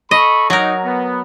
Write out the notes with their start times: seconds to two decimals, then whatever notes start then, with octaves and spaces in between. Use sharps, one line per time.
0.11 A4 D#5 B5 C#6
0.50 F#3 D#4 A#4
0.85 B3